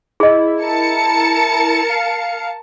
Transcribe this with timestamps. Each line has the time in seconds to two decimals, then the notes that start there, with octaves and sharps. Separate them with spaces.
0.20 E4 G#4 D#5
0.59 A#4 A5 C#7
1.89 F5